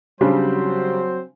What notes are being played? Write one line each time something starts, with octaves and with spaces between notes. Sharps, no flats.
C#3 F#3 G3 C4 D4 C5